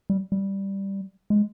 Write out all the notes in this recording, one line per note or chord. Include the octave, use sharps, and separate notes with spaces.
G3
G3
G#3